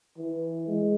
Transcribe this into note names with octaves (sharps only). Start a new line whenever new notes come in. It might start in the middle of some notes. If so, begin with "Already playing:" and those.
E3
G#3